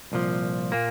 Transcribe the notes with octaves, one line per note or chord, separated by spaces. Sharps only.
C2 A#2 F3
A#2 A#3